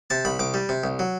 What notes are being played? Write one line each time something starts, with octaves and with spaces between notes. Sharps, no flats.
C3 A5
C2 B5
C2 D6
G3
C3
C2
F#3